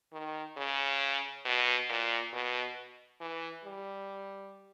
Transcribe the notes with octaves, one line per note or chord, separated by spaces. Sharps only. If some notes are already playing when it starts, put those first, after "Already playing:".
D#3
C#3
B2
A#2
B2
E3
G3